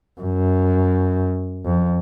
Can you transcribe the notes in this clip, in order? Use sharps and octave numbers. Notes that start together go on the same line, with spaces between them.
F#2
F2